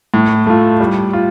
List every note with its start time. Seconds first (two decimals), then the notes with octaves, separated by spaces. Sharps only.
0.14 A2
0.46 A3 F4
0.80 G3
1.13 F4